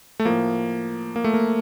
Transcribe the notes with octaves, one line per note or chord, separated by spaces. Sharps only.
A3
A2 F3 A#3
A#3
A3
A#3